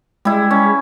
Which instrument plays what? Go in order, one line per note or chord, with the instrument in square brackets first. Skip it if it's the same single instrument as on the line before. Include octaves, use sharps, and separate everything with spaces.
[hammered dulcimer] G3 E4 [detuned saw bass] G#3
[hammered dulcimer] C#4